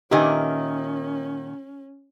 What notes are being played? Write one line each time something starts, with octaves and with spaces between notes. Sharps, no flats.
A#2 D#3 C#4 G4 B4 D#5 E5 G#5